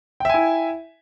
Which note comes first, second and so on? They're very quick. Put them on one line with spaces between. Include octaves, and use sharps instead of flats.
G5 E5 G#5 E4